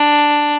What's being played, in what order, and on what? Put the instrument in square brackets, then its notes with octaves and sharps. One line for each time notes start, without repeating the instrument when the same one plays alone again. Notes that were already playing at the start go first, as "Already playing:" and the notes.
Already playing: [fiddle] D4